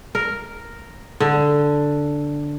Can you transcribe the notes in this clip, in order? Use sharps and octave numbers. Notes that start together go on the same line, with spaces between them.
A#4
D3